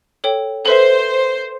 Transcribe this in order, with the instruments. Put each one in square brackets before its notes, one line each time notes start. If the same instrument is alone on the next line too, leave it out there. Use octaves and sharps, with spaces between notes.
[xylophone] A4 C#5 G5
[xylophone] A4 B4 E5 [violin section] C5